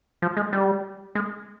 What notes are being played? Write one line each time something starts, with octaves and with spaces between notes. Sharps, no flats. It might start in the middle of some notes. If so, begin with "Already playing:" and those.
F3
G#3
G3
G#3